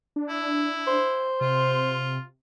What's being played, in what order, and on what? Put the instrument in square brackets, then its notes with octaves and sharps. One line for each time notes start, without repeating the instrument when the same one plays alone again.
[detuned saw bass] D4
[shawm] E4
[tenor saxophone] C5
[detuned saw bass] C3 [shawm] F4